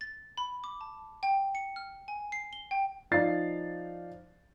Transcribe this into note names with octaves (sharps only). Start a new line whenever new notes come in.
A6
B5
D6
A5
G5
C#7
F6
G#5
C7
G7
G5
F3 D#4 D5 F5 A6 C7